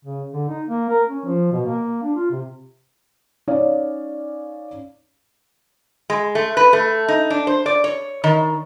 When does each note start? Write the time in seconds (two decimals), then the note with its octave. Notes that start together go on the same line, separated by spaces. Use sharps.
0.05 C#3
0.33 D3
0.48 D#4
0.67 A#3
0.89 A#4
1.09 C#4
1.25 F3
1.52 B2
1.66 A#3
2.02 D4
2.15 F4
2.31 C3
3.47 C#4 D#4 C#5 D5 F5
6.10 G#3
6.35 A3
6.57 B4
6.73 A3
7.08 D#4
7.30 D4
7.47 C5
7.66 D5
7.84 C#5
8.24 D#3